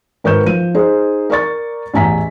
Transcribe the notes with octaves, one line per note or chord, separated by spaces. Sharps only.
G#1 A#4 B4 C#6 G6 E7
F3 D#7
D#4 G#4 C5
A#4 D5 C#6 A6
A1 E2 E5 G#5 A#5 B6